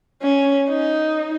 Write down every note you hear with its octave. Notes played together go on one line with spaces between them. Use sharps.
C#4
D#4